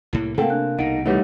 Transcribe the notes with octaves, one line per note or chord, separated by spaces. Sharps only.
C2 A2 A#3 E4
C3 A#3 C4 A4 F#5 G5
D4 F#6
C2 B2 D#4 F#5 D7
E3 G3 A3 D#4 C#5 F#5